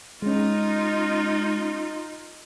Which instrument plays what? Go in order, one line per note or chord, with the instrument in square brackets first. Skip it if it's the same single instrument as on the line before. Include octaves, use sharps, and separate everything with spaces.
[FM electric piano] G#3 C#4 [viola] D#4 F4